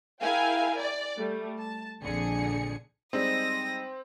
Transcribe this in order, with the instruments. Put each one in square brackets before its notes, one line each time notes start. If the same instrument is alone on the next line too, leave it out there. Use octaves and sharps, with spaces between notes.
[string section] E4 G#4 A#4 F5 G5 G#5
D5
G3 A3
A5
A#1 F2 D3 G#4 C#7
[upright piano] G3 G#3 D#4 [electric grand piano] C4 [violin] D#6 A#6